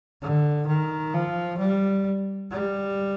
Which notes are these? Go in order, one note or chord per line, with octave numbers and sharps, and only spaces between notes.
D3
D#3
F3
G3
G3